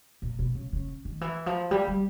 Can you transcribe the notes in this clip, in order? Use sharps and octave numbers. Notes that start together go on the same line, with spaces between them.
A#2
B2
C#3
C#3
D#3
E3
F3
G3
G3